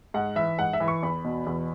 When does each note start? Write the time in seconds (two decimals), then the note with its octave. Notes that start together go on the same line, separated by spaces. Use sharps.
0.14 G#2 F#5
0.36 E3 E5
0.59 G#2 F#5
0.73 E5
0.80 E3
0.88 C#6
1.03 E2 B5
1.24 B2
1.46 E2